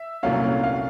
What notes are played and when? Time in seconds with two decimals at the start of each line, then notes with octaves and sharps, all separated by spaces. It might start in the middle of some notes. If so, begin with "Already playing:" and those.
Already playing: E5
0.23 C2 A#2 F#3 A3 C#4 F5
0.63 F5